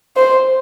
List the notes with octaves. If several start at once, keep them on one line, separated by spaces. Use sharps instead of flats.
C5